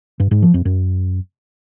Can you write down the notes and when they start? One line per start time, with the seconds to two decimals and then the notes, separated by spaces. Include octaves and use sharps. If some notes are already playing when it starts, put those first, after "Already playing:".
0.20 G2
0.31 G#2
0.42 F3
0.54 F2
0.65 F#2